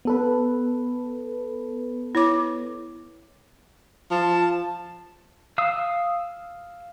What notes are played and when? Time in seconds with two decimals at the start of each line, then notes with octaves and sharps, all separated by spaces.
0.05 B3 A4 B4
2.15 E4 C#5 D6
4.11 F3 A5
5.58 F5 D#6 E6